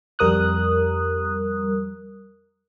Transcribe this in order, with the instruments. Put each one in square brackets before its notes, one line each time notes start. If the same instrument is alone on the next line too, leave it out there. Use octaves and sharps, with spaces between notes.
[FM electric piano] F2 G3 A#4 D#6 F#6